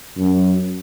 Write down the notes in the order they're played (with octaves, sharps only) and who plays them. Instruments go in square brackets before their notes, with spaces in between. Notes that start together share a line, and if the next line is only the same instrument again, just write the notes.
[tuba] F#2